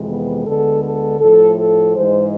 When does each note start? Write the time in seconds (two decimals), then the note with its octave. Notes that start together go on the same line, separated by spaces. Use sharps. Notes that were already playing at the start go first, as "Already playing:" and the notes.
Already playing: F2 C3 E3 G#3
0.10 B3
0.47 D2 D3 G#3 B3 A4
0.83 A4
1.20 A2 F3 A3 A4
1.58 A4
1.95 G#2 E3 G#3 C5